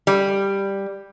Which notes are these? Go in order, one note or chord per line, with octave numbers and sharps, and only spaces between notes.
G3